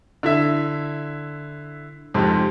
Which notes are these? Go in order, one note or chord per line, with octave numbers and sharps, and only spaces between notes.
D3 E4 E5
F2 G#2 C3